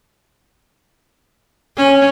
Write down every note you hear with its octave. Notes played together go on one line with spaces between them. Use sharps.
C#4